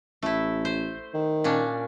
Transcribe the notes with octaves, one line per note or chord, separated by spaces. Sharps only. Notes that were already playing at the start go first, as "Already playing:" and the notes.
A1 A3 E4
C5
D#3
A#2 C#4 D4